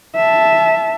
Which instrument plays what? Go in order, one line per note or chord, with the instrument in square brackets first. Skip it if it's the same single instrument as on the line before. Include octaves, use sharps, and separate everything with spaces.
[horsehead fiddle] E5 A5